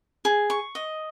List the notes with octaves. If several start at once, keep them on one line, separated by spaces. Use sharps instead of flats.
G#4
C#6
D#5